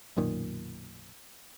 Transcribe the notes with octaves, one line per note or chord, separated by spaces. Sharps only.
B1 F#2 A#2 D#3